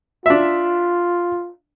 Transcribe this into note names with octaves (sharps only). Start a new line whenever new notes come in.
D4 F4 E5